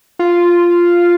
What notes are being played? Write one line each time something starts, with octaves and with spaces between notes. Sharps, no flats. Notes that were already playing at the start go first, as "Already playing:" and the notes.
F4